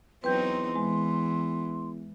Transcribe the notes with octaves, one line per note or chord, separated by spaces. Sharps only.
E2 F#3 C4 D#4 B4 G5 C6 G6
E3 G#3